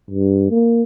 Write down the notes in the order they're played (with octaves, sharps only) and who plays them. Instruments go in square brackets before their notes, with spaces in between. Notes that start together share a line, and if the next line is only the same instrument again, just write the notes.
[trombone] G2
A#3